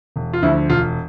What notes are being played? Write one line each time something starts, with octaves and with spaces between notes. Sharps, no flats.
E1
F4
D2 D3 F3 E4
E1 F4